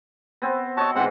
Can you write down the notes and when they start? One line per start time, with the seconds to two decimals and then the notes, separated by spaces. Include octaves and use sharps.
0.42 B3 C4
0.77 F#4 C#5 D#5 A5
0.95 G#2 E3 C4 C5 F#5